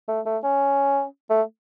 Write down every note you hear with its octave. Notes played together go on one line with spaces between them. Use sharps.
A3
A3
C#4
A3